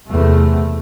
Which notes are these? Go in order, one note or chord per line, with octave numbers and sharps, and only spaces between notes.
E2 C3 A3